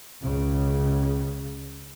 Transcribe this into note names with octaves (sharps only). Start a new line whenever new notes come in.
C#2 C#3